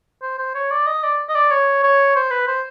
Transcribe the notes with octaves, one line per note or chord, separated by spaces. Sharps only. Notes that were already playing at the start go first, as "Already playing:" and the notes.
C5
C5
C#5
D5
D#5
D5
D#5
D5
C#5
C#5
C5
B4
C5